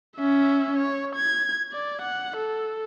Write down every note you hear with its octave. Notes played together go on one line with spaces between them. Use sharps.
C#4 E5
C#5
G#6
D5
F#5
A4